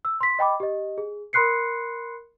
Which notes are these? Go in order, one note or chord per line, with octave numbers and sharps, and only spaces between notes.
E6
C6 B6
D#5 G5 B5 D6
G4 D#5
G#4
A#4 B5 C6 F#6 C7 C#7